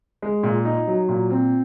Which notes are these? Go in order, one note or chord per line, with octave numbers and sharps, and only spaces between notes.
G#3
A#2
D#4
F#3
A#2
C4